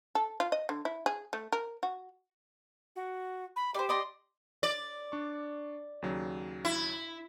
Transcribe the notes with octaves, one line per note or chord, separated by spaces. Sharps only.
A4
F4
D#5
D3
E4
G#4
A3
A#4
F#4
F#4
B5
G4 C5 D5
D5 D#5 C6
D5
D4 C#6
D#2 C#3 F#3
E4